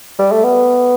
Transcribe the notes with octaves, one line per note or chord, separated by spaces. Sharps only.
G3
A3
B3